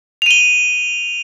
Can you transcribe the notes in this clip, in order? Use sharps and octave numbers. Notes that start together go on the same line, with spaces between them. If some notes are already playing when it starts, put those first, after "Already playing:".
D#7 F7 G7